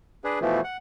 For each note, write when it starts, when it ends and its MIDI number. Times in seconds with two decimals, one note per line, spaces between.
0.24 0.39 62
0.24 0.39 68
0.24 0.39 71
0.41 0.61 47
0.41 0.61 52
0.41 0.61 53
0.41 0.61 57
0.64 0.77 78